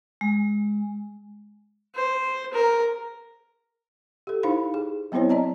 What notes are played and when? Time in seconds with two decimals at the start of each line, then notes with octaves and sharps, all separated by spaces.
0.21 G#3
1.95 C5
2.53 A#4
4.27 G4 A4
4.43 D#4 E4 C5 F5 B5
4.74 G#4
5.12 F#3 B3 C4 E4 C5 C#5
5.30 D5 D#5 A5 A#5